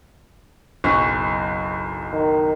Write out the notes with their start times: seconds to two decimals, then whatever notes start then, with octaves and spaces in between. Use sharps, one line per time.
0.84 F#1 B1 C#6
2.14 D#3